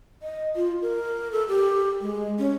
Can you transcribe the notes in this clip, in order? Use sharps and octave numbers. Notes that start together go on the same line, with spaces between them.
D#5
F4
A#4
A4
G4
G#3
C#4